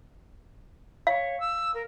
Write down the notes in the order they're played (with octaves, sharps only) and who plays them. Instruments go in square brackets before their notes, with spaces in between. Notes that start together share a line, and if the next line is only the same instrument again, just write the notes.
[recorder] C#5 [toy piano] F5
[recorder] E6
A#4